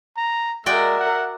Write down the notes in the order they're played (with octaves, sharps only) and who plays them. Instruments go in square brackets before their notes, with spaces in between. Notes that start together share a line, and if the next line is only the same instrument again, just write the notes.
[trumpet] A#5
[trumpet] G#3 [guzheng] F#4 D5 G5 [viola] A#4 E5
[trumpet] F#5